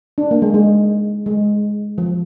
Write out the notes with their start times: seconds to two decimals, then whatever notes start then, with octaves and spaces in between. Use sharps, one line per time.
0.18 D4
0.31 A#3
0.42 G#3
0.54 G#3
1.26 G#3
1.98 F3